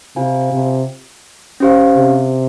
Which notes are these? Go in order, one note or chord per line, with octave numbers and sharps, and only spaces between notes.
C3 F4 C5 F5 G#5
C3
C#4 G4 C5 F5
C3